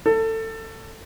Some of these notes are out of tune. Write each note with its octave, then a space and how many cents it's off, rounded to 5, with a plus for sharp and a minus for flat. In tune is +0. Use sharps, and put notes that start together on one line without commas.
A4 +25